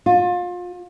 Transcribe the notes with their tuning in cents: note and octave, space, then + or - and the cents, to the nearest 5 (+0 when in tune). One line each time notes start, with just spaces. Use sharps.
F4 +30